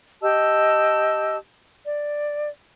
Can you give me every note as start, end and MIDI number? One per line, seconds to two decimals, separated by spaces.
0.22 1.36 67
0.22 1.36 75
0.22 1.36 81
0.22 1.36 88
1.85 2.49 74